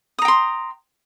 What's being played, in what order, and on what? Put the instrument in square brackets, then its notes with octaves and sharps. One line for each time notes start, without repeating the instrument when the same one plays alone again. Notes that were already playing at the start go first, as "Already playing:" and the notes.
[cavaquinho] D#6
A#5
G5
C6